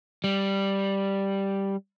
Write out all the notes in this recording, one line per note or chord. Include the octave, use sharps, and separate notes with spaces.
G3